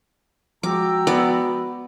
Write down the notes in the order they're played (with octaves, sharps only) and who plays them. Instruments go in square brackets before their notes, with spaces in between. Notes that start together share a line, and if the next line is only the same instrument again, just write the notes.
[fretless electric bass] F3 G#3 [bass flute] F#4 [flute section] G5 A#5 E6 [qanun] D6
[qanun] B3 D5 D6